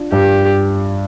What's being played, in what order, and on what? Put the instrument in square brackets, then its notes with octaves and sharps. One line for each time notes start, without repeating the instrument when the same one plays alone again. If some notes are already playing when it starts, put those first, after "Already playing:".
Already playing: [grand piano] D4 F4
[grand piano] G2 [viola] G4